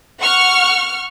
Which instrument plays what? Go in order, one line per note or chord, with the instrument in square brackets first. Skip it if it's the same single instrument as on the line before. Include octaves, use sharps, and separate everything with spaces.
[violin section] F#5 C#6 F6